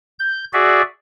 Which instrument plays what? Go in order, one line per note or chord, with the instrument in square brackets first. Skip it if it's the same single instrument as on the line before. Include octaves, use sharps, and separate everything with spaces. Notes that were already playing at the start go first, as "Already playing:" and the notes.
[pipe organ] G6
F#4 G#4 D5 E5